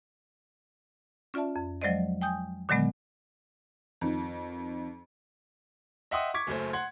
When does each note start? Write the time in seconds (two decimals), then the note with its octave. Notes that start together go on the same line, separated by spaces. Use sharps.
1.34 C#4 F4 D5 E5 A5
1.56 F2
1.82 F3 F#3 G#3 C5 D5 D#5
2.21 G5 G#5 D#6 G6
2.69 A#2 D3 D#3 F#3 G#3 B3
4.01 F2 D#3
6.11 D#5 E5 F#5 G5 C6 D#6
6.34 C#6 D6 G#6 B6
6.47 F#1 F#2 A3 C5
6.73 F#5 C6 G#6